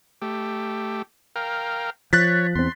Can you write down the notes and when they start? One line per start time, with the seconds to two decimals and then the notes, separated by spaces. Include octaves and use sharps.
0.22 A3 G4
1.36 A#4 F5 G5
2.13 F3 C#5 F#6 A6 B6
2.55 E2 C4 C6